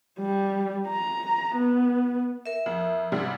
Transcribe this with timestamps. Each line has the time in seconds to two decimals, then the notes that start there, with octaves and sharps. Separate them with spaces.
0.20 G3
0.88 A#5
1.56 B3
2.46 A#4 E5
2.66 F2
3.12 G#2 C3 G3